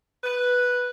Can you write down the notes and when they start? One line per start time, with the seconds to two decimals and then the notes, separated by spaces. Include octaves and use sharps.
0.23 B4